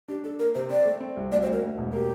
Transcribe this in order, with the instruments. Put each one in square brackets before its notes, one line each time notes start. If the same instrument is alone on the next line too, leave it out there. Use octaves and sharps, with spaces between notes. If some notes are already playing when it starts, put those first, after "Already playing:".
[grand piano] D4 [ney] G4
[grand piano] D4 [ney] A4
[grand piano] A#3 [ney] A#4
[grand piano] C3 [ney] C5
[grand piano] C4 [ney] D5
[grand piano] A3
C4
C2
[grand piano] D2 [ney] D5
[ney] C5
[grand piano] D2
[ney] A#4
[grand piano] D2
E1
[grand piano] A#3 [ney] G4